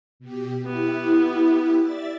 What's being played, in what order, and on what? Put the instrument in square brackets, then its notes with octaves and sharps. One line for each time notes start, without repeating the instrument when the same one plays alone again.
[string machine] B2 G4
[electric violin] B3 [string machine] E4 G4
[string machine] D5 E5 A6